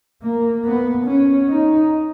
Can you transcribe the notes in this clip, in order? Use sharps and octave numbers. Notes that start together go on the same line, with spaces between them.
A#3
B3
C#4
D#4